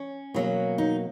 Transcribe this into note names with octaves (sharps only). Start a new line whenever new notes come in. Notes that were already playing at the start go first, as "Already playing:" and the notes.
Already playing: C#4
B2 F#3 A#3 C#4
D#4